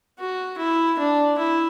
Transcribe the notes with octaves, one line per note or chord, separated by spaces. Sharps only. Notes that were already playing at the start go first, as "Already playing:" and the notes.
F#4
E4
D4
E4